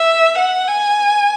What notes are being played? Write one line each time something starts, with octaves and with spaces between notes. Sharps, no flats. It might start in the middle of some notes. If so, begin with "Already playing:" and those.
Already playing: E5
F#5
G#5